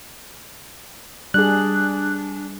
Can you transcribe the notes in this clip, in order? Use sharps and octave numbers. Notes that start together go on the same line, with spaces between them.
G3 D4 G#4 F#6